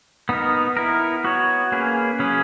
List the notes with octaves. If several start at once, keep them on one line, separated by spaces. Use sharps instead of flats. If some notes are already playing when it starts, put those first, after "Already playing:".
B3 D#4 A#4
B3 E4 A#4
B3 F#4 C#5
A#3 C#4 G#4 B4
C#3 F#3 C#4 G#4 B4